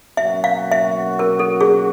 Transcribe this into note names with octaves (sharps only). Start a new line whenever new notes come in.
B2 F#3 A#3 C#4 F#4 E5
F5
E5
A#4
A4
G#4